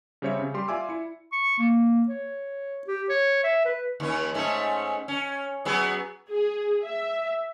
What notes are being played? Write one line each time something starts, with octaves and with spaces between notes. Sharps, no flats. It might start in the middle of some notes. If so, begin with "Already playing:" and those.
C#3 G3 C4 C#5 E5 C#7
C#3
G3 G4 C6
F4 D5 E5 G#5 D6 E6
E4 C#7
C#6
A#3
C#5
G4
C#5
E5
B4
D#2 C#4
G#2 A3 C#4
C#4
F#3 B3 G#4
G#4
E5